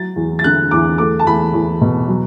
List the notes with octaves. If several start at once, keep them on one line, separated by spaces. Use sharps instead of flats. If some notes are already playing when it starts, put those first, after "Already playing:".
Already playing: F#3 A6
E2
A6
D3 F#6
E2 D6
A3 D6
A5
E2 B5
E2
B2
F#3